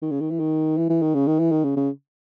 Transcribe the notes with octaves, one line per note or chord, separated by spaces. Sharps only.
D#3
C#3
D#3
E3
D#3
E3
E3
D#3
C#3
D#3
E3
D#3
C#3
C#3